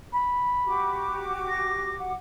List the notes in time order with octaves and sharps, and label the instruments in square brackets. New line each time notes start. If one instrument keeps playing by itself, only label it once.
[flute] B5
[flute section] F#4 G4 D6
[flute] A#6
F#5